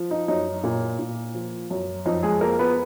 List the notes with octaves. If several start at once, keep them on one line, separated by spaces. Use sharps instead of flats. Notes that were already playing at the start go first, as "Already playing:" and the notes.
Already playing: F3
D#4
F#2 D#4
A#2
A#2
F3
F#2
F2 D#4
G#3 G#4
F3 A#3 A#4
B3 B4